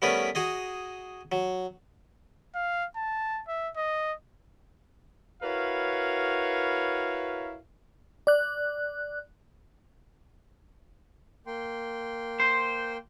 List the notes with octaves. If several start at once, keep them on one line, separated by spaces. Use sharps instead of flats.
G3 A3 B3 C#4 A#4 B4
F#4 G#4 D#5
F#3
F5
A5
E5
D#5
E4 F#4 A#4 B4 C#5 F5
D5 F#6
A#3 G5 C6
C5